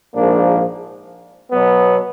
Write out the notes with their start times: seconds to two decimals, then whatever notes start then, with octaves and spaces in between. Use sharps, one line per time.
0.14 A#1 G#2 F3 A#3 D4
1.51 B2 F#3 B3